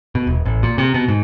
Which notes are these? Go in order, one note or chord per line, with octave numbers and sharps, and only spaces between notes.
B2
D#1
A1
A#2
C3
B2
G#2